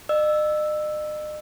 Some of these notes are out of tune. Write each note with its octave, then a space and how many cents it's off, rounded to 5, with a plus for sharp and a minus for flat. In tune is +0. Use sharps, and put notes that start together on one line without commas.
D#5 -40 E6 +0